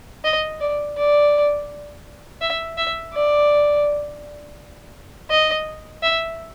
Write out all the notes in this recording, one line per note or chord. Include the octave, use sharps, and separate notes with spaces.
D#5
D5
D5
E5
E5
D5
D#5
E5